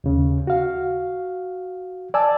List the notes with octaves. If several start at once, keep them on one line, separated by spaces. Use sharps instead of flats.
D#2 C#3
F#4 F5
D5 G#5 A5 E6